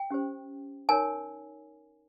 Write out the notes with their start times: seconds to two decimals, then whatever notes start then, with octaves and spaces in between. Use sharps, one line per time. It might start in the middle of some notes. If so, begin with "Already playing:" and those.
Already playing: G5
0.11 C#4 G4 C5
0.89 D#4 A#4 C#5 G#5